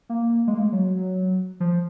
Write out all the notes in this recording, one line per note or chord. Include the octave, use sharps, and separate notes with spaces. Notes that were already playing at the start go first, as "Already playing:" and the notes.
A#3
G#3
A#3
G#3
F#3
F3